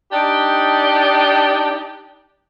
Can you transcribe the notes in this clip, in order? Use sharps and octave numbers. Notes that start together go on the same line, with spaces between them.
D4 D#4 G4